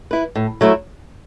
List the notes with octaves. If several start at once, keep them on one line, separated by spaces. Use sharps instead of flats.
E4 B4
A2
F#3 A3 E4